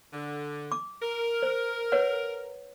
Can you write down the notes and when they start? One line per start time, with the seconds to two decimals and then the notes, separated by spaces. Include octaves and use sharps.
0.13 D3
0.72 D6
1.02 A#4
1.43 C5
1.92 B4 C#5 F#5